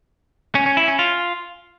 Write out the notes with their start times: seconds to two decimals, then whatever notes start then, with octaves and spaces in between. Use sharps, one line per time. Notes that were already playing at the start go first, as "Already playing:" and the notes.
0.55 C#4
0.66 C#4
0.77 E4
0.88 C#4
0.99 F4